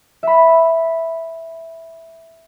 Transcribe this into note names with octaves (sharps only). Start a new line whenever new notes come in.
E5 B5